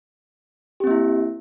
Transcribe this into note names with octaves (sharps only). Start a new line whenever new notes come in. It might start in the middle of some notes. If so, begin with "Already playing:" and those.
A#3 C4 E4 G4